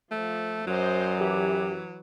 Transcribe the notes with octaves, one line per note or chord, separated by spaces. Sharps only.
F3 A3
F#2 F#3 C5 D5 D#5
E3 G4